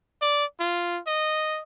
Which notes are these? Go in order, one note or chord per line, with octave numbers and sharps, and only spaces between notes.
D5
F4
D#5